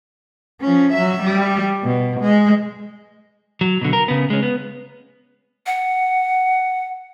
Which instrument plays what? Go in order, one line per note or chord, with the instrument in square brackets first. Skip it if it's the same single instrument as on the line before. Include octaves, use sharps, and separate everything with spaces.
[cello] F3 C#4
F#3 E5
G3
B2
G#3
[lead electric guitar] F#3
B2 D3
A#4
C#3 B3
G#3 C#4
B3
[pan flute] F#5